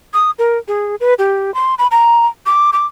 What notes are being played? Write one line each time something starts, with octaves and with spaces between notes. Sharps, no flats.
D#6
A#4
G#4
B4
G4
C6
B5
A#5
D6
D6